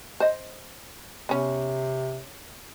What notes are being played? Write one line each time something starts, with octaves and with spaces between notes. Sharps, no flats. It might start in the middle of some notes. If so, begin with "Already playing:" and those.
C5 D#5
C3 B3 C#4